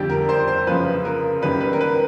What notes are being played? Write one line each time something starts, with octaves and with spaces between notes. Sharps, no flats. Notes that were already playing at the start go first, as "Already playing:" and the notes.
Already playing: F2 D3 G3 G4
A#4
C5
C5
F#2 C#3 F3 B4
A#4
F#2 D#3 G3 B4
B4
A#4
B4